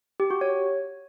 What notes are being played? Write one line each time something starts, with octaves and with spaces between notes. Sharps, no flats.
G4
F#4
C#5